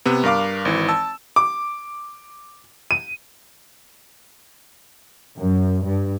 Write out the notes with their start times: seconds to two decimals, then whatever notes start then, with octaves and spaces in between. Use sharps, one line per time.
0.05 C3 B3
0.24 G2 A#4 F5 D6
0.65 G#1 E3
0.89 A5 E6
1.36 D6
2.91 D#7
5.40 F#2
5.86 G2